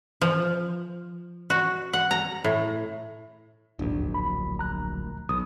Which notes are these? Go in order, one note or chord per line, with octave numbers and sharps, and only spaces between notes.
F3
F#4
F#5
A#5
A2
D1 A#1 D#2 G#2 D4
B5
A#5 F#6
B1 D#6